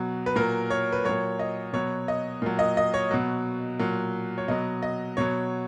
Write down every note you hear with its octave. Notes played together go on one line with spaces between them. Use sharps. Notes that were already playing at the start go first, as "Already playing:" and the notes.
Already playing: B2 F#3
B4
A#2 F#3 A#4
C#5
B4
A#2 F#3 C#5
D#5
B2 F#3 C#5
D#5
A#2 F#3
D#5
D#5
C#5
B2 F#3
A#2 F#3
C#5
B2 F#3 D#5
D#5
B2 F#3 C#5